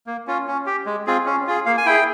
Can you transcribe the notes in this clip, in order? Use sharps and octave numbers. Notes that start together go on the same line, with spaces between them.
A#3
C#4 F4
C#4
G4
G#3
C4 F4 G#4
C#4
F4 G#4
A#3 F5
G#5
E4 G#4 G5